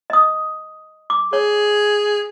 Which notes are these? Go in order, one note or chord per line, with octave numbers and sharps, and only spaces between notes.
D#5 D#6
D6
G#4 C#5